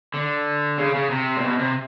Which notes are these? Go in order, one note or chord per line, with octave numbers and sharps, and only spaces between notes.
D3
C#3
C#3
C3
A#2
B2
C3